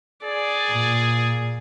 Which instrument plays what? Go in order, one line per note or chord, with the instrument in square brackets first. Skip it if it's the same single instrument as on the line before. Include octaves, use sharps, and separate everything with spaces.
[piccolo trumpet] G#4 [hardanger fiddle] D5
[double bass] A#2